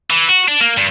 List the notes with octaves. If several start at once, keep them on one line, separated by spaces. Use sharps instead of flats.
E3
F#4
D4
A#3
G2